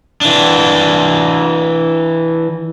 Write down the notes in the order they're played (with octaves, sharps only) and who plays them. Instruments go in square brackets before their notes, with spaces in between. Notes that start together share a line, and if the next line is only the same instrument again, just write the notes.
[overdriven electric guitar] E3 D4